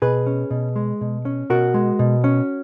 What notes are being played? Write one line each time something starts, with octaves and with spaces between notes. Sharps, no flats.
B2 G#4 B4
C#4
B2
G#3
B2
C#4
B2 F#4 A#4
G#3
B2
C#4